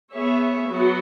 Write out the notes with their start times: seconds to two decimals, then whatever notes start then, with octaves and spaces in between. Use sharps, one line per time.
0.13 B3 G#4 C#5 E5
0.70 F#3 B3 F#4